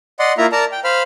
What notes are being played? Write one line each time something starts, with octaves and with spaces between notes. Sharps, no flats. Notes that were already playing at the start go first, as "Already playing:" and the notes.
D5 D#5 F#5 C6
A#3 E4 F4 E5 A#5
A#4 D5 A5 A#5
G5
C5 F5 B5 F6